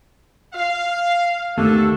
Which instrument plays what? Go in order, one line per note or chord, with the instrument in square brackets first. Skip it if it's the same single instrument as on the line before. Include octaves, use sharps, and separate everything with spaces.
[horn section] F5
[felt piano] D#2 A3 [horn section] D3 A4